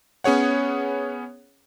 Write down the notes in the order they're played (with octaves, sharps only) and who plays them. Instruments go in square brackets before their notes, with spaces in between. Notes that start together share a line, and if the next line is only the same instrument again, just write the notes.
[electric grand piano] B3 C#4 G#4 C#5 F#5